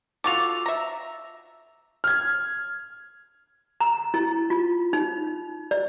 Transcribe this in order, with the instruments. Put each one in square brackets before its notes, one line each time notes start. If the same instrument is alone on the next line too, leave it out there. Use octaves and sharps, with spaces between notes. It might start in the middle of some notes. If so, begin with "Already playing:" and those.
[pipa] F4 F#4 A4 [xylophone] D6 F7
[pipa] E5 A#5
[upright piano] F6 G#6
[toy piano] A#5
E4
F4
D#4
D5